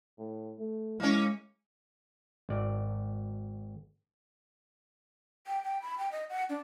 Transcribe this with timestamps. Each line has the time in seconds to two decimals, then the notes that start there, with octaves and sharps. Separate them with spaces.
0.19 A2
0.59 A3
1.00 G#3 A#3 C#4 E4
2.49 G#1 D5
5.47 G5
5.64 G5
5.82 B5
5.98 G5
6.12 D#5
6.30 F#5
6.49 D4